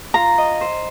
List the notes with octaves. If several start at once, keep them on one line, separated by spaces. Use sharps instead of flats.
F4 A#5
D#5
C5